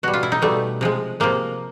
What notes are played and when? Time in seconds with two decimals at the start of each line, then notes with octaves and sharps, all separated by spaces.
0.03 B2 G3 F#4
0.14 F4
0.23 E4
0.32 D#4
0.42 B2 G3 A3
0.81 C3 F3 G#3
1.20 C3 F3 G#3 A#3